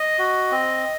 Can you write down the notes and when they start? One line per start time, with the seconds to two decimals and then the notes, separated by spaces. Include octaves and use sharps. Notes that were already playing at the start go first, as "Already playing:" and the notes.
Already playing: D#5
0.19 F#4
0.51 C4